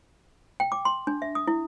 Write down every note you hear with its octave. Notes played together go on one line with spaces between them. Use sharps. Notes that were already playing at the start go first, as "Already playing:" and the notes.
G5
D6
C6
D4
E5
D#6
E4